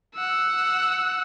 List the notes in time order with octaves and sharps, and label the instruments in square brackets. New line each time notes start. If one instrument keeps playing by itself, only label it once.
[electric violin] F#5 E6